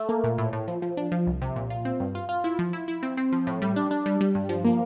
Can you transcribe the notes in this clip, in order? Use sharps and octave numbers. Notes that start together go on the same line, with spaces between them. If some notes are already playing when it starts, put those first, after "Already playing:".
Already playing: A3
A#3
A#2
A2
A2
F3
F3
D4
F3
C2
C3
A#2
F4
C4
G2
F4
F4
E4
F3
E4
E4
C4
C4
F3
A2
G3
D4
D4
G3
G3
G2
F3
A#3